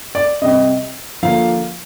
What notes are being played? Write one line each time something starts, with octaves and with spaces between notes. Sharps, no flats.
D5
C3 G3 C4 D#5
D3 F3 A#3 F5